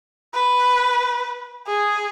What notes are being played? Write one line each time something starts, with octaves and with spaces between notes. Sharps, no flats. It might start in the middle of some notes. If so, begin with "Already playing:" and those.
B4
G#4